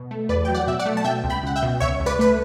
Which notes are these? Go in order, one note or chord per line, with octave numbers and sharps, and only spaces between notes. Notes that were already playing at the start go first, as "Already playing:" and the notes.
Already playing: B2
A3
E2 B4 D5
F#3 G5
D5 F#5
B2 E5
D5 F#5
A3
A5
B2 E5 G5
C#2
G5 B5
C#2 F#5
E5 G5
B2
C#2 C#5 E5
C#2
B4 D5
A3 B4